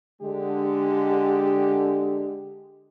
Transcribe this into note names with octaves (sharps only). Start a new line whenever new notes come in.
D3 G#3 G4